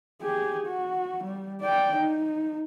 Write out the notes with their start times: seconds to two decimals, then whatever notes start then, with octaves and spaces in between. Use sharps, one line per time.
0.22 G4 G#4
0.66 F#4
1.24 G3
1.61 D5 G5
1.96 D#4